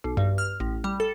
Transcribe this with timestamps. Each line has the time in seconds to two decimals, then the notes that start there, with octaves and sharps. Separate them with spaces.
0.04 B1
0.17 G2
0.38 F6
0.60 A1
0.84 G3
1.00 A4